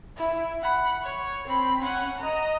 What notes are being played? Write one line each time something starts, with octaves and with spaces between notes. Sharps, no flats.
E4
F#5 B5
C#5
C4 B5
C#4 F#5
D#5 A#5